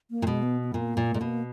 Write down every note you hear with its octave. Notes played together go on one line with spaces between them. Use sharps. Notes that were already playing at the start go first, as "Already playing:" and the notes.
A#3
A#2
B2 G#3
B3
B3
A#2 A#3
A#2
A#2 G#3
B2 A#3